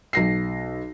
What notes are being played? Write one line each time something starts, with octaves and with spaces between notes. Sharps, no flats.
B1 A#6 C7